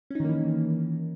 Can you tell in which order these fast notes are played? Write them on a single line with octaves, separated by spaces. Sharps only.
C#4 D#4 D#3 A#3 E3